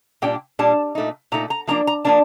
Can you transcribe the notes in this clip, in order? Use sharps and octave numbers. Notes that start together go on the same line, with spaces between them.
A#2 G3 D4 G5
A#2 G3 D4 A5
A#2 A3 D#4
A#2 A3 D#4 A#5
A#5
F3 A#3 D4 A#5
A#5
F3 A#3 D4 A5